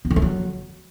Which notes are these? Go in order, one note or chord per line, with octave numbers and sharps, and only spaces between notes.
B3
D3
A3
F#3